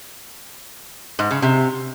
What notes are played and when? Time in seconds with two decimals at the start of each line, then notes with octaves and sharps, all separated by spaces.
1.19 G#2
1.31 C#3
1.42 C3